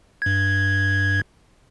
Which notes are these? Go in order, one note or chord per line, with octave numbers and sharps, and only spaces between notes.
G2 G#6